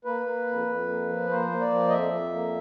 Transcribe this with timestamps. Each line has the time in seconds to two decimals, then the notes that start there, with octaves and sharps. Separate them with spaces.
0.05 A#3 B4
0.26 A#3
0.47 F2
0.67 F2
0.88 A#3
1.09 F3
1.29 A#3 C5
1.50 A#3
1.61 D5
1.71 F3
1.88 D#5
1.92 F2 E5
2.13 F2
2.34 A#3